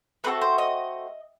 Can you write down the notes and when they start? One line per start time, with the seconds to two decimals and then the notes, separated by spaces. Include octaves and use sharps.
0.24 A3 C4 F#4 A4 B4
0.41 C5
0.58 D#5